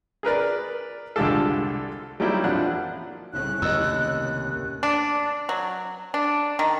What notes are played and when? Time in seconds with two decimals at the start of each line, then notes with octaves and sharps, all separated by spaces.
0.23 G#4 A#4 B4 D5
1.16 C2 D3 G#3 F4 G4 A4
2.20 F#3 G3 A#3 D#4 E4 G4
2.44 A1 F3 D4 F#5 F#6
3.33 C2 A2 C#3 F#6
3.62 D#2 D#5 E6
4.83 D4
5.49 F#3
6.14 D4
6.59 D#3